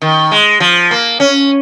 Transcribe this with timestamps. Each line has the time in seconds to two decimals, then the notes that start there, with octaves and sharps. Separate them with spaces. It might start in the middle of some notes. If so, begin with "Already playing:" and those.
0.02 D#3
0.32 G#3
0.60 F3
0.91 A#3
1.20 C#4